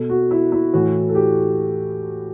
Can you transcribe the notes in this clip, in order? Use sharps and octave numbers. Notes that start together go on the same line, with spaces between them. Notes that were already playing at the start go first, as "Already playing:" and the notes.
Already playing: B2 A4
F#4
E4
E4
A2 E3 F#4
A4
G4